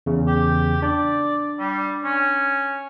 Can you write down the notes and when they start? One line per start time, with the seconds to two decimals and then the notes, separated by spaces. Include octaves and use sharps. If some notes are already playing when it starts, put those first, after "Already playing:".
0.06 E2 C#3
0.27 G4
0.82 D4 D5
1.59 G3
2.04 C#4